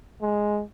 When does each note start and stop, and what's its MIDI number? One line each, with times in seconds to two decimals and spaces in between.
0.22 0.62 56